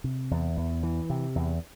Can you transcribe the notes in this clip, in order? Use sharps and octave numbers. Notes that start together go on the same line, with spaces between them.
C3
E2
E2
E3
C3
E2